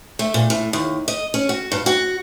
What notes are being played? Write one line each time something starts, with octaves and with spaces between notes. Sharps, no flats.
A3
A#2
A2
D#2
D#5
C#4
F#4
G2
F#4